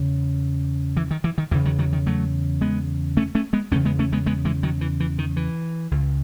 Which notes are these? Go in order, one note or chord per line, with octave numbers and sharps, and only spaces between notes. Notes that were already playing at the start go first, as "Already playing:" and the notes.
Already playing: E2 C#3
E3
D#3
E3
D#3
E2 C#3 E3
D#3 F#3
D#3 F#3
D#3
F#3 A3
G#3 B3
A3 C#4
A3 C#4
G#3 B3
E2 C#3 A3 C#4
G#3 B3
A3 C#4
G#3 B3
G#3 B3
E3 G#3
D#3 F#3
E3
E3
D#3
E3
C#2 C#3